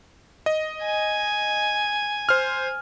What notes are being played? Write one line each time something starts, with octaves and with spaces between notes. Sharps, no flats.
D#5
G#5
C5 F6